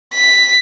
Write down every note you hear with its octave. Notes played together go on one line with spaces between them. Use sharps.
B6